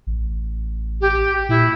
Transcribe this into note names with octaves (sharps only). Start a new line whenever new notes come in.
A1
G4
A#2 E4